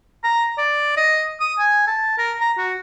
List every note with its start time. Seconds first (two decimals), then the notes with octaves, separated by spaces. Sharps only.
0.24 A#5
0.58 D5
0.97 D#5
1.40 D#6
1.59 G#5
1.87 A5
2.18 A#4
2.41 A#5
2.58 F#4